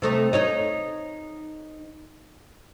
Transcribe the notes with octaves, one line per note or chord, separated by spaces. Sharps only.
C3 A3 D#4
D#4 C#5 D#5